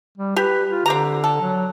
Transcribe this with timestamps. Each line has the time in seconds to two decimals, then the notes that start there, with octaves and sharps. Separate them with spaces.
0.17 G3
0.36 G4 B4
0.70 F4
0.86 D3 C4 G4 A#5
1.24 A4
1.42 F#3